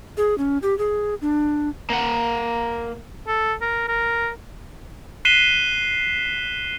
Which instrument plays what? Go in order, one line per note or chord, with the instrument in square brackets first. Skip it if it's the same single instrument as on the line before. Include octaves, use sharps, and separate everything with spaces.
[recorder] G#4
C#4
G4
G#4
D4
[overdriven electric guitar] A#3 F#5
[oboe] A4
A#4
A#4
[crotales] F#6 B6 C7 D#7 E7 G7